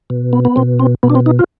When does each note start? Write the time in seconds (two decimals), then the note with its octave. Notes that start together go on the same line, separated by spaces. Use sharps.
0.10 B2
0.33 B3
0.45 B3
0.56 B2 C4
0.80 C4
1.03 B2 B3
1.10 D4
1.15 C4
1.26 D#4
1.39 F4